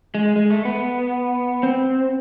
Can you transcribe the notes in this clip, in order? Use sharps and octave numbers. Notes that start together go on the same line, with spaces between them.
G#3
G#3
A3
B3
C4